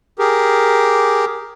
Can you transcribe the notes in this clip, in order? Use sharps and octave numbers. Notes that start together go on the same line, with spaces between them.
G4 G#4 A#4